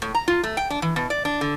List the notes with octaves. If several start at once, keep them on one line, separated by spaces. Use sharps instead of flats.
A2
A#5
F4
A3
G5
D4
E3
B2
D5
D4
D3